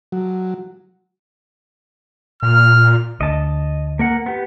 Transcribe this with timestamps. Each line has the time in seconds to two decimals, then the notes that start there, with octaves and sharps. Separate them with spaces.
0.12 F#3
2.43 A#2 F6
3.21 D2 D#5 A5
3.99 A#3 A#4 F#5
4.26 B3 G4